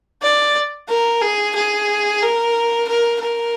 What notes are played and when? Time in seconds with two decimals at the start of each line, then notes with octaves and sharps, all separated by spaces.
0.22 D5
0.89 A#4
1.22 G#4
1.55 G#4
2.22 A#4
2.88 A#4
3.21 A#4